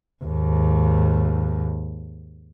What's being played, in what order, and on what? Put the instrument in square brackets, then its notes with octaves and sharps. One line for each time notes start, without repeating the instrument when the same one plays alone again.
[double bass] D#2 G#2